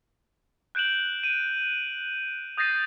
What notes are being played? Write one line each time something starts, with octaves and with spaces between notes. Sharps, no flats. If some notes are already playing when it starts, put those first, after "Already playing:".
F#6 G6 D7 E7 F#7
D#7
D#6 G6 A6 A#6 C7 D#7